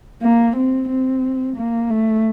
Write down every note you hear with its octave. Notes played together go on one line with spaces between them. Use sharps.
A#3
C4
C4
A#3
A3